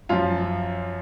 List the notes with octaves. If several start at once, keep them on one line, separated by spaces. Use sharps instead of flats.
F#2 F3 F4